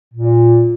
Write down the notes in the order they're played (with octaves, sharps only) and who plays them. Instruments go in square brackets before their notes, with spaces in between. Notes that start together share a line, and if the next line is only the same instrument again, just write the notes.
[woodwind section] A#2